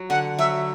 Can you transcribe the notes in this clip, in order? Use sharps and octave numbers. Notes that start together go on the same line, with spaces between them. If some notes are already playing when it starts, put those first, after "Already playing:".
Already playing: F#3
D3 F#5
F#3 E5